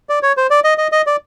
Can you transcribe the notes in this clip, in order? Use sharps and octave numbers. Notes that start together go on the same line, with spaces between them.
D5
C#5
C5
D5
D#5
D#5
D#5
D5